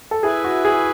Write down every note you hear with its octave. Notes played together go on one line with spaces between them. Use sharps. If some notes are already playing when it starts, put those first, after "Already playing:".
A4
E4 G#4 B4 E5 G#5
F#4
G#4